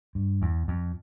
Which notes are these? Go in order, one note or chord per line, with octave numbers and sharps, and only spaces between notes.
G2
E2
F2